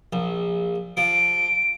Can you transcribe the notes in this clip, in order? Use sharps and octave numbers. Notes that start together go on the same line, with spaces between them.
A#1
F3 D7